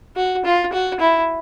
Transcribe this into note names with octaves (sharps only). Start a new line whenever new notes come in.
F#4
F4
F#4
E4